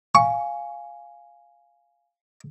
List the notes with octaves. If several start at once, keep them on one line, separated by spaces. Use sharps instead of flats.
F5 G#5 C#6